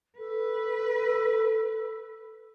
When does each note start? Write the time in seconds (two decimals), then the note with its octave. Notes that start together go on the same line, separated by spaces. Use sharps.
0.18 A4 B4